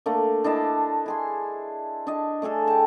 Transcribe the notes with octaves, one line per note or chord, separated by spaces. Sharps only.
A3 A#3 D4
D4 E4 D#5 A5
E4 G#4 C6
D4 D#5
A3 D4 G#4 A4
G4 A5